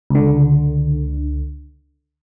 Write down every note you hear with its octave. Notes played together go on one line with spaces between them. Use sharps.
C#2 D3